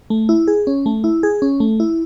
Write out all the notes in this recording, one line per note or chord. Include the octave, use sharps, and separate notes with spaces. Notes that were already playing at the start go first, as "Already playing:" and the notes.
A3
E4
G#4
C#4
A3
E4
G#4
C#4
A3
E4